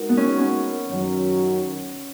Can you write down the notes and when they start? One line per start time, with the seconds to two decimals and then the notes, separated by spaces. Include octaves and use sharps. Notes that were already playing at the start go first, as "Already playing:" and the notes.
Already playing: G#3 D#4 F#4 A#4
0.09 B3
0.17 C#4
0.41 C#4
0.89 F#2 D#3 F#3